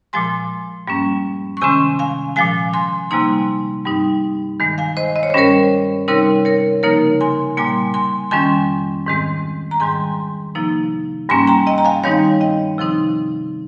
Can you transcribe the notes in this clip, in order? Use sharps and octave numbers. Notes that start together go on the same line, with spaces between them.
A#2 F3 G#3 G#5 C6
G2 G3 A#3 C#4
C#6
C3 D#3 G#3 C#4 G#5 C6
F5 G#5
A#2 F3 G#3 F5 G#5
G#5 C6
C3 G3 A#3 D#4 G#5 C6
G2 G3 C4 D#4
G2 D#3 G#3
F5 G#5
C5 D#5
D#5
C#5
C5
G2 G3 C#4 A#4 C#5
C3 G3 C4 D#4 A#4 C#5
A#4 C#5
C#3 F3 A#3 D#4 A#4 C#5
G#5 C6
A#2 G3 A#3 G#5 C6
G#5 C6
F2 D#3 G3 C#4 G#5 C6
G#2 D#3 G#3 C4
A#5
G#2 D#3 G3 G#5 C6
C3 F3 A#3 D#4
G2 G3 A#3 C#4 G#5 C6
G5 A#5
D#5 G5
A#5
F5 G#5
G2 D#3 G3 C4 D#4 C#5 F5
D#5 G5
C3 F3 C4 D#4